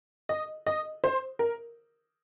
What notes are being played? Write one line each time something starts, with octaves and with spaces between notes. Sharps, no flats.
D#5
D#5
C5
A#4